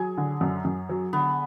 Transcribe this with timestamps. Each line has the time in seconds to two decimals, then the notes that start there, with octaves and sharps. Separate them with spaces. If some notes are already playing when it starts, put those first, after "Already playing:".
Already playing: F#3 G#4
0.18 D3
0.41 F#2
0.65 F#2
0.89 F#3
1.13 D3 B3